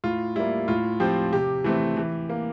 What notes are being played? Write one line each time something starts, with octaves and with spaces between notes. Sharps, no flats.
A2 F4
G3 A#3 E4
A2 F4
F3 C4 G4
C3 G4
E3 A3 C4
E3
A#3